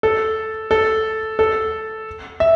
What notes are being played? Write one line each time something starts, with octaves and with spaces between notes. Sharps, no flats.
A4
A4
A4
E5